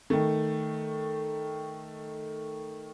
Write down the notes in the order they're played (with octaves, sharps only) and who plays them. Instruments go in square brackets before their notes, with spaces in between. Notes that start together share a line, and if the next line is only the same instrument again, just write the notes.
[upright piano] D#3 A3